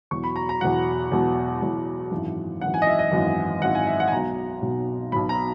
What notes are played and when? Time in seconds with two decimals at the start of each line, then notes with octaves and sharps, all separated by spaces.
0.11 E2 B2 F#3 C#6
0.24 B5
0.36 A#5
0.49 A#5
0.61 E2 B2 F#3 F#5
1.11 E2 B2 F#3
1.62 E2 B2 F#3
2.11 G#1 F#2 E3
2.61 G#1 F#2 E3 F#5
2.74 G#5
2.82 D#5
2.87 E5
2.99 D#5
3.12 G#1 F#2 E3
3.62 G#1 F#2 E3 F#5
3.75 G#5
3.87 E5
4.00 F#5
4.08 G#5
4.12 B1 B2 F#3 A#5
4.62 B1 B2 F#3
5.12 B1 B2 F#3 B5
5.29 A#5